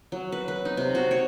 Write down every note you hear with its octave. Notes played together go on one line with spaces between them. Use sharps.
F#3
B4
B4
D#4
C3
F#4
C#5